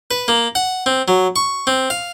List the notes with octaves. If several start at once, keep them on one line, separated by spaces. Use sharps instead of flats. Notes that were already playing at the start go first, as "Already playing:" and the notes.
B4
A#3
F#5
C4
F#3
C#6
C4
F5